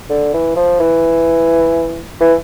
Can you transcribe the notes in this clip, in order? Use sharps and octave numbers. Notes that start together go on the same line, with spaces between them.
D3
E3
F3
E3
E3